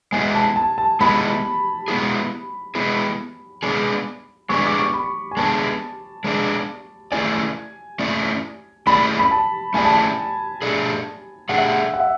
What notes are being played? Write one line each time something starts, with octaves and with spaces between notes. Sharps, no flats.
G#3 B3 E4 G#4 G#5
A5
A5
A5
G#3 B3 E4 G#4 B5
G#3 B3 E4 G#4
G#3 B3 E4 G#4
G#3 B3 D4 G#4
G#3 B3 D4 G#4 C#6
D6
C#6
B5
G#5
G#3 B3 D4 G#4 A5
G#3 B3 D4 G#4
A3 C#4 E4 G#4 D5 G#5
A3 C#4 E4 G#4 D5
A3 C#4 E4 G#4 D5 B5
B5
A5
A3 C#4 E4 G#4 D5 G#5
A5
G#5
A3 D4 G#4
A3 D4 G#4 F#5
E5
F#5
F#5
E5